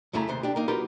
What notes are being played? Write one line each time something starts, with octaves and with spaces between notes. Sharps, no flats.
C2 F2 C#3 A3 E4 A#5
D#2 C3 C5
D4 G4
A#3 D#4
F#3 D#4 F4 G4 A#4 B4